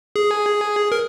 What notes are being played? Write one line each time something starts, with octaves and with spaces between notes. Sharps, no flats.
G#4
A#4